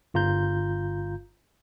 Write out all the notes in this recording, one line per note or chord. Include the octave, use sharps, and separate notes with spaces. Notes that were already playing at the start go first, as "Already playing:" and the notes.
G1 F4 A#5 G6